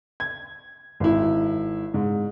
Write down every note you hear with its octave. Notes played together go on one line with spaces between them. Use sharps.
G#6
G#1 E4
G#2